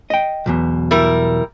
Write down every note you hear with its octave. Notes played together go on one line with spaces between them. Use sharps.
D#5 G5
B1 E2 B2
G3 E4 A#4